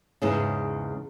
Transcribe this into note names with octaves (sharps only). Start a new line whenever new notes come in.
E2 G#2 C#3